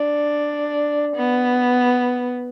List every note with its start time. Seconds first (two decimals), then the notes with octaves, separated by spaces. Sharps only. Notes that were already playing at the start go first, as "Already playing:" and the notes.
Already playing: D4
1.17 B3